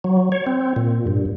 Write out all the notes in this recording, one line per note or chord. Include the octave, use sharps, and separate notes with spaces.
F#3
C#5
C4
A#2
G2